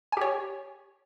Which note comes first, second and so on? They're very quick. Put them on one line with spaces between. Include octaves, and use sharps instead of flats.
G#5 G4 C#5